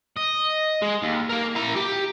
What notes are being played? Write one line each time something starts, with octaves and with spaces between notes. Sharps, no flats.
D#5
G#3
D#2
A#3 A#4
E4 A#5
G4